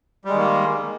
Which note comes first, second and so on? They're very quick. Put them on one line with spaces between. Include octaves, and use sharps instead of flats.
G3 G#3 D#3 A#3